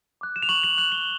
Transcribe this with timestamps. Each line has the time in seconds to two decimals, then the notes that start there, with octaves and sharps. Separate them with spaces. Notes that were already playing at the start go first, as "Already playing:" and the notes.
0.21 D6 F#6
0.36 E7
0.43 F7
0.49 C#6 F#7
0.64 F#7
0.78 F#6 F#7
0.92 G7